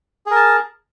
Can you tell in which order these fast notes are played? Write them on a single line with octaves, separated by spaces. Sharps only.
G#4 A#4 A5